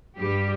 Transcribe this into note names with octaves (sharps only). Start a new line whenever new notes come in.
G2 G3 G4